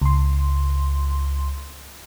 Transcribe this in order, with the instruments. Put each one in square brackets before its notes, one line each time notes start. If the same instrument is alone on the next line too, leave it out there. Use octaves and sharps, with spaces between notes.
[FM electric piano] C#2 C6